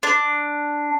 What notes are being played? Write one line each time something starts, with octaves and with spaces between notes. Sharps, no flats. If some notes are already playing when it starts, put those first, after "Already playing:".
D4